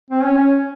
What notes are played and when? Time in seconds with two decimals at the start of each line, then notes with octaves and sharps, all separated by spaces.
0.10 C4
0.24 C#4
0.38 C#4